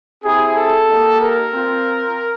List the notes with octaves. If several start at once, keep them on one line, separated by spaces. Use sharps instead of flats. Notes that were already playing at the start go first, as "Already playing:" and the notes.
C4 E4 G4 G#4
A4
A#3 D#4 G4
A#4
C4 F4